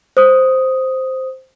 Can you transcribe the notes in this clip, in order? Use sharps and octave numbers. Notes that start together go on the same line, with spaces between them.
C5 D#6